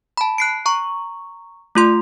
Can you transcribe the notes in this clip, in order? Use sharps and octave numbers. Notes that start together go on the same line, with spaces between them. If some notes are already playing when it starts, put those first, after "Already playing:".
A5 B5
F#6 C7 D7
A#5 C#6
A3 F4 C6